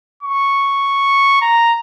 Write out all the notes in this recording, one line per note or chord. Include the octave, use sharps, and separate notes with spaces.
C#6
A#5